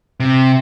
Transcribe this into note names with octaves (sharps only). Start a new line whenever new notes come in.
C3